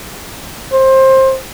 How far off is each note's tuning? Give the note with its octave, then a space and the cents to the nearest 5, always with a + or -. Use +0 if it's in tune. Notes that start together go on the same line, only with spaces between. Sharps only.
C5 +20